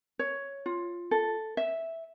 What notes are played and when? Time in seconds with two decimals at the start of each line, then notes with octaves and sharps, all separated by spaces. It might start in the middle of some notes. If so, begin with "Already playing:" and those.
0.19 C#5
0.66 F4
1.11 A4
1.57 E5